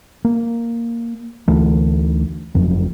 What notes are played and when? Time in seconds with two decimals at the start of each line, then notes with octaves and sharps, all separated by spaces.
0.25 A#3
1.48 D2 E3 A3
2.55 F#1 F2 F3 F#3